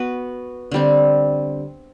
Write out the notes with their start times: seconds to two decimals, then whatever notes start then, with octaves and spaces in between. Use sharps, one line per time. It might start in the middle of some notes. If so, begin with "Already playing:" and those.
Already playing: B3 F#4 B4
0.71 D3 G3 C4